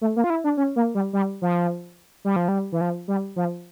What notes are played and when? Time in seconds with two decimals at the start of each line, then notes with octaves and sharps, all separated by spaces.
0.01 A3
0.16 A#3
0.24 F4
0.30 E4
0.44 D4
0.57 C#4
0.76 A#3
0.95 G3
1.13 G3
1.42 F3
2.25 G3
2.36 F3
2.48 G3
2.72 E3
2.81 F3
3.08 G3
3.36 F3